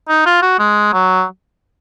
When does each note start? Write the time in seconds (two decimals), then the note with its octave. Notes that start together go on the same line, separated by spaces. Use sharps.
0.09 D#4
0.26 F4
0.42 F#4
0.59 G#3
0.93 F#3